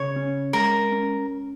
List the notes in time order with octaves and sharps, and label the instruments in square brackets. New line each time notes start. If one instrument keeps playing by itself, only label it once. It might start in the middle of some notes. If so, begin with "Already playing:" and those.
Already playing: [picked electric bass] C#3 [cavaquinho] C#5
[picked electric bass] C#4
[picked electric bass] G#3 [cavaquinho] A#4
[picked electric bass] C#4